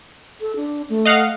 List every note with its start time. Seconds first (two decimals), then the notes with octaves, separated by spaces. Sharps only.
0.41 A4
0.56 D4
0.89 A3
1.05 D#5 F5 F#5